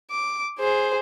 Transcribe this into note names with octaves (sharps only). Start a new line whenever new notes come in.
D6
G#4 C5